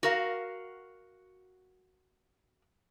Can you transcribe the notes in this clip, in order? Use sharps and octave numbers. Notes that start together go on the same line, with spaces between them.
F#4 A#4 F5